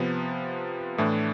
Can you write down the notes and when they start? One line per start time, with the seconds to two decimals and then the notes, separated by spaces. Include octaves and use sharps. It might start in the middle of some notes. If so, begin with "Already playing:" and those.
Already playing: C3 F3 B3
0.98 A2 E3 A3 D4